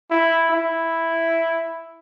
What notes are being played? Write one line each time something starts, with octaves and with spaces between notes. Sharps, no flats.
E4
E4